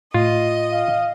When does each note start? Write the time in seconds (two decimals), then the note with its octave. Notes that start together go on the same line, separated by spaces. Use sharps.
0.14 A2 F4 D#5
0.72 F5